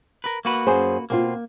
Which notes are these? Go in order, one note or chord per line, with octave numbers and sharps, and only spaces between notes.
A#4 B4
A#3 F#4 B4
F#2 G#4 C5
B2 A#3 C4 F4